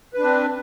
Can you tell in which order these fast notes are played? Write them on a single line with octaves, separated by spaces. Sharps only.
B4 D4 C4